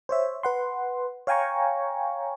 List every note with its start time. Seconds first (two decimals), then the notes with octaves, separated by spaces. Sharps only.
0.09 C5 C#5 E5
0.43 B4 F#5 C6
1.27 C#5 F5 G5 G#5 A#5 C#6